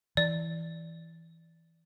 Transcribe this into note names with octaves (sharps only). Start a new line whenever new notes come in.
E3 D5